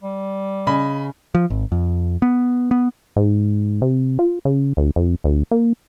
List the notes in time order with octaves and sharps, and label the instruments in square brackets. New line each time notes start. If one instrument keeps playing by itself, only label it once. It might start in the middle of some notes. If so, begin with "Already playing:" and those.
[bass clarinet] G3
[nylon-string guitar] C#3 [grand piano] D#5 G#5 B5
[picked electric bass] F3
G#1
F2
B3
B3
[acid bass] G#2
C3
F4
C#3
D2
F2
D2
A#3